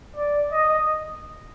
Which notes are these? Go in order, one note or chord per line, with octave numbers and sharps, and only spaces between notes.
D5
D#5